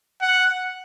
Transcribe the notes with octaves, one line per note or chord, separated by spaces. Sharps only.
F#5